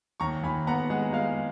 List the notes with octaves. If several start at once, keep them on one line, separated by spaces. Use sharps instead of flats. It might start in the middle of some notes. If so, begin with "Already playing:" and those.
D#2 A#5 C#6
D#2 G#5 B5
B3 F#5 A#5
G#3 F#5
G#3 F5